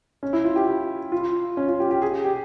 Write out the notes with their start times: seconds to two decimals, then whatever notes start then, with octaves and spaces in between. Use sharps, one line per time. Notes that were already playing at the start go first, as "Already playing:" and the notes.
0.23 C#4
0.33 E4
0.45 F4
0.56 G4
0.67 G4
1.12 F4
1.57 C#4
1.68 F4
1.80 G4
1.91 G4
2.02 G#4
2.24 G4